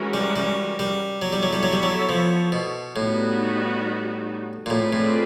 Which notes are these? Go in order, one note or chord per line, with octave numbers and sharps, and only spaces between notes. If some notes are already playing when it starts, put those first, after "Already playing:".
Already playing: E3 G#3 C#4 F#4 A#4
G3
G3
G3
F#3 B3 E4 A4 C#5
G3
F#3
G3
F#3
G3
F#3
F3
B2
A2 G3 B3 D#4 F#4
A#2
A2 C4 F4 G#4 B4 D5
A2